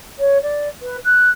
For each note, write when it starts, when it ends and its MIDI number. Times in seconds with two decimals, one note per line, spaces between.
0.18 0.37 73
0.42 0.68 74
0.82 0.96 71
1.04 1.29 90